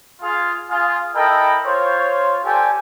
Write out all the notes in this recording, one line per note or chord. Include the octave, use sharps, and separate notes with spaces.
F4 G#4 F5
F4 G#4
E4 A4 A#4 D#5 G5 B5
F4 C5 C#5
G4 A4 C5 D5 G5 G#5